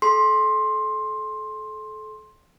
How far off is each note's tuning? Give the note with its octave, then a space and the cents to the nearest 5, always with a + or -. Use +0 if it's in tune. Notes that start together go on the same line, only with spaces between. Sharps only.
A4 -30 C6 +15